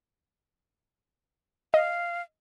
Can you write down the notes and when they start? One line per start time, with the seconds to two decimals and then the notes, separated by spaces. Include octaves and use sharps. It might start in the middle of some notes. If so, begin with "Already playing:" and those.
1.74 D#5 F5